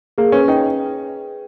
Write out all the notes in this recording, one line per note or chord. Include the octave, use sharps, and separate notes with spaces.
A#3 G#4
C#4 B4
D#4 G5